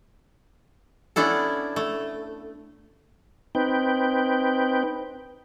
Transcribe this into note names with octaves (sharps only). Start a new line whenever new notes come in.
B3 C#4 D4 E4 A4
A3
C4 D#4 B4 G5